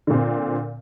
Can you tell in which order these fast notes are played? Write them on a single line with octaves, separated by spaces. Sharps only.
D3 A#2 C4